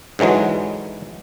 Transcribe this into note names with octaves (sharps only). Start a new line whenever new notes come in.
G#2 D3 E3 F#3 G#3